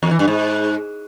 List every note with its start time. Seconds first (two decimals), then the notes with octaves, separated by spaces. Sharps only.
0.03 E2
0.11 E3
0.19 G2
0.28 G#2